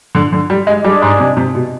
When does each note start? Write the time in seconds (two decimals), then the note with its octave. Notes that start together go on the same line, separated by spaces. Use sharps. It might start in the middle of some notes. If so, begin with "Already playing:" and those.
0.15 D3
0.33 D3
0.50 G3
0.67 G#3
0.85 G3 G#3 D4 G#4 D5
1.02 G#2
1.20 C3
1.37 C3
1.55 B2